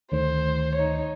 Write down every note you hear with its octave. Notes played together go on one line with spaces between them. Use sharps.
D2 D#3 A3 C5
D#4 C#5